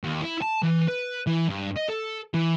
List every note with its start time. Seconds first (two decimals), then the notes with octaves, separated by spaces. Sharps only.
0.04 D#2
0.21 E4
0.42 A5
0.63 E3
0.88 B4
1.27 E3
1.49 G2
1.76 D#5
1.89 A4
2.34 E3